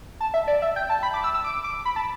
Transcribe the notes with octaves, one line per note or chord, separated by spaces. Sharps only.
A5
E5
D5
E5
G5
A5
B5
D6
E6
E6
D6
D6
B5
A5